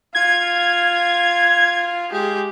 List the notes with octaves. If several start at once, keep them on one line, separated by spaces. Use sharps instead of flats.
F4 G#6
G#3 G4